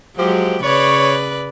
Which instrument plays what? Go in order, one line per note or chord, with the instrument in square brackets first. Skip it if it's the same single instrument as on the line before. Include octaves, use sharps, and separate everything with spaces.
[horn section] F3 G4 [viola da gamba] F#3 G#3
[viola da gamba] C#3 B4 D5 [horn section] C#5